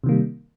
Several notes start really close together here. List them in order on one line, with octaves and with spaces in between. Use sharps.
C3 D#3 A#3 G3